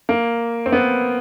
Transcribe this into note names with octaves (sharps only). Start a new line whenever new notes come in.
A#3
C4
B3